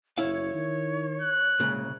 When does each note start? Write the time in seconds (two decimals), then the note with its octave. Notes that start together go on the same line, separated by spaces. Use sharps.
0.18 F#1 E4 C#5 F5
0.54 D#3
1.21 F#6
1.60 C2 A#2 C#3 G#3